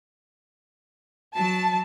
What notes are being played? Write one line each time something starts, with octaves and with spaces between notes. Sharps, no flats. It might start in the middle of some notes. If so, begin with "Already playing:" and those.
F#3 A5